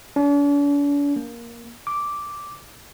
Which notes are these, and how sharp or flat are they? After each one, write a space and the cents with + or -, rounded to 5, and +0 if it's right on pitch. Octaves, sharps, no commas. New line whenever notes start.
D4 -45
A#3 +10
D6 -5